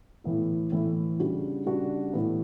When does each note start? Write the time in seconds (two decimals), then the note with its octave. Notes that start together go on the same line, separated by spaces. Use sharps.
0.24 A2 E3 B3 E4
0.72 A2 E3 B3 E4
1.19 C#3 G3 D4 F#4
1.66 C#3 G3 D4 F#4
2.13 A2 E3 B3